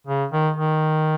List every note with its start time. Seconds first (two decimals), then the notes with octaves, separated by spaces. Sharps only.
0.07 C#3
0.32 D#3
0.57 D#3